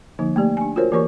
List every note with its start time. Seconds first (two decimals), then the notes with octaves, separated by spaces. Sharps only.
0.19 D3 F3 A#3 D#4
0.36 A3 A#3 G4 D5
0.57 D4 G#5
0.76 F4 F#4 A#4 C5 C#5
0.92 E3 A#3 G4 A#4 C#5 C#6